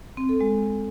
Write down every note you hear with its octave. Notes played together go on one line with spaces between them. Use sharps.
C4
A4
G#3